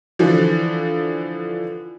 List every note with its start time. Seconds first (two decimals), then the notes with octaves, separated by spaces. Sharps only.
0.19 D3 E3 F3